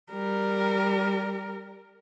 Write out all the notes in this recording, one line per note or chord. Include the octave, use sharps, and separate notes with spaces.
G3 A#4